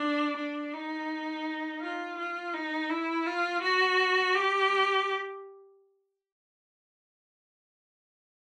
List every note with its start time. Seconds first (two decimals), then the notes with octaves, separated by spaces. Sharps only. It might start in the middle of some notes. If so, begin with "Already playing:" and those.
Already playing: D4
0.37 D4
0.73 D#4
1.81 F4
2.18 F4
2.54 D#4
2.89 E4
3.27 F4
3.62 F#4
4.35 G4